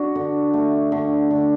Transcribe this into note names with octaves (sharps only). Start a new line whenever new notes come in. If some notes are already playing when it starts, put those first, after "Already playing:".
Already playing: D4 F#4
D3
A3
D3
D3